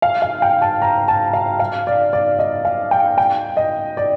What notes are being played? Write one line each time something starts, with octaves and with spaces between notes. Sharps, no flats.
F5
F5
G5
A5
A#5
A5
F5
F5
D5
D5
D#5
F5
G5
G5
D#5
D5